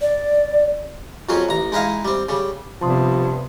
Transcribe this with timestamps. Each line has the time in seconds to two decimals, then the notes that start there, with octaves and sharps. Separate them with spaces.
0.01 D5
1.29 F2 F3 F#3 C#4 G#4
1.49 A1 A#5
1.72 G#3 D#4 E4 D#5 F5
2.05 G3 C4
2.29 C#3 G3
2.81 G2 C3 F3 B3 A5 C6 D#6